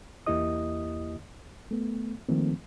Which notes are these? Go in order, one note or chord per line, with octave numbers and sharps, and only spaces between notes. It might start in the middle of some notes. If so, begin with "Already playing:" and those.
E2 A#3 E4 G4 D#5 D#6
A3 B3
D#3 F3 A3 A#3 C4